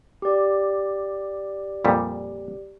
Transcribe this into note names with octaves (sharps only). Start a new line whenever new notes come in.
G4 D5
F2 A#2 G3